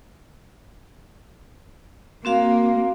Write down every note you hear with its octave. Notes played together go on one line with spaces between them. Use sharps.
A#3 C4 F#4 F5